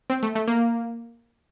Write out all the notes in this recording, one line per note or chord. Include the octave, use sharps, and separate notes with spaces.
C4
A3
A3
A#3